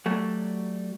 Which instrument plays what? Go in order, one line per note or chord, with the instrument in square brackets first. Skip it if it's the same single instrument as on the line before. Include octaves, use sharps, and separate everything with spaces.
[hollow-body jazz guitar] F#3 G3 A3